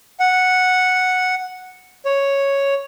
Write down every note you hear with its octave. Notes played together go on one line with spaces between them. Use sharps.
F#5
C#5